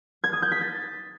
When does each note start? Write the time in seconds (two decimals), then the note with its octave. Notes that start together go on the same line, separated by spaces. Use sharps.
0.24 G#6
0.33 D#6
0.42 G6
0.52 B6
0.61 A6